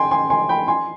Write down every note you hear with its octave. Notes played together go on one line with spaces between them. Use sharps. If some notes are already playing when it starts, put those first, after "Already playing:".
Already playing: G5 G#5 C6
G#5 C6
G#5 C6
G5 B5
G#5 C6